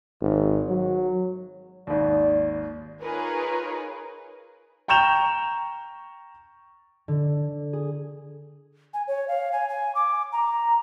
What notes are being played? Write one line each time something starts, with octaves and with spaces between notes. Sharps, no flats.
G#1
F#3
G#1 D#2 D5
D#4 F4 G#4 A#4 B4 C#5
G5 A#5 C#6 G6 E7 F7
D3
G#4
G#5
C#5
F5
G#5
G#5
D6
A#5